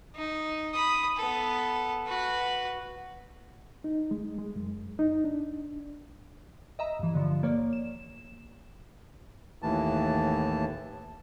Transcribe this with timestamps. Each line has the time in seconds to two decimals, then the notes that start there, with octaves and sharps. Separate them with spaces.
0.16 D#4
0.74 B5 D#6
1.17 B3 A4
2.07 F#4 B4
3.84 D#4
4.11 G#3
4.38 G#3
4.56 F#2
4.99 D#4
5.24 D4
6.79 D#5 E5 A#5
6.99 G2 E3
7.13 G2 D3 F3
7.43 A#3 C#5 D5
7.73 E7
9.62 D#2 A2 E3 A5